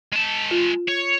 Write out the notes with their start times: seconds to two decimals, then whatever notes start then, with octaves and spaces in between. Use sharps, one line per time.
0.13 G#3 A5
0.51 F4
0.89 C#5